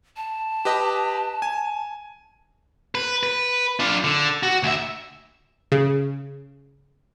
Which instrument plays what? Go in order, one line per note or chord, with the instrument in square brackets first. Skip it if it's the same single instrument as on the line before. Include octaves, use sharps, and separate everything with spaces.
[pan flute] A5
[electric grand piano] G4 B4 D#5
G#5
[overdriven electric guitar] B4
B4
D4 F4
D3
F#4
D2 E5
[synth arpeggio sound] C#3